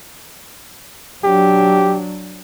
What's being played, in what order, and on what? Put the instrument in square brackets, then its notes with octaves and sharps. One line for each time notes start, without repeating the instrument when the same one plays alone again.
[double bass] F#3 D4 [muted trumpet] G4